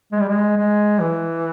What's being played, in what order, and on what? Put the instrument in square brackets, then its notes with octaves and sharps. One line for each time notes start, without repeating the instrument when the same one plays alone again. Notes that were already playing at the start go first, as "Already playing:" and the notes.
[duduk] G#3
G3
G#3
G#3
E3